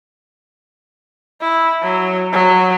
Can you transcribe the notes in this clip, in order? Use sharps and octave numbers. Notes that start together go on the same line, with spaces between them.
E4
F#3
F#3